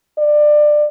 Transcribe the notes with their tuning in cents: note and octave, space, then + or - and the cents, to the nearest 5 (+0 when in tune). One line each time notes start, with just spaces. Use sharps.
D5 +20